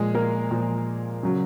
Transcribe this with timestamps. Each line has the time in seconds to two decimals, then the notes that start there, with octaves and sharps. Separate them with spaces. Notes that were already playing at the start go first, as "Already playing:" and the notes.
Already playing: A#2 F3 G#3 G#4
0.15 A#3 A#4
0.51 A#2 F3
1.23 C#3 F#3